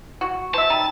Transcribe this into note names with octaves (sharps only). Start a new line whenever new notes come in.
F#4
C5 E5 A5
G3 D#4